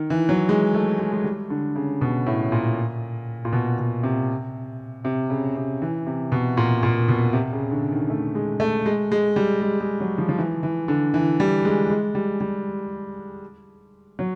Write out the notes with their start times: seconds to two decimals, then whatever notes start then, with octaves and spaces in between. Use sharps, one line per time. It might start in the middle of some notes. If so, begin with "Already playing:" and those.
Already playing: D#3
0.10 E3
0.29 F#3
0.49 G#3
0.74 A3
0.99 G#3
1.13 G#3
1.24 G3
1.50 D3
1.76 C#3
2.01 B2
2.26 A2
2.52 A#2
3.45 A#2
3.52 B2
3.78 B2
4.03 C3
5.05 C3
5.30 C#3
5.56 C3
5.82 E3
6.06 C3
6.32 B2
6.57 A#2
6.83 A#2
7.08 B2
7.33 C3
7.52 C#3
7.71 D3
7.91 D#3
8.10 A3
8.35 G#3
8.60 A3
8.86 G#3
9.12 G#3
9.36 G3
9.62 G#3
9.81 G#3
10.00 F#3
10.18 F3
10.29 F3
10.38 E3
10.63 E3
10.88 D3
11.14 E3
11.40 G3
11.65 G#3
11.90 G#3
12.15 G3
12.40 G3
14.19 F#3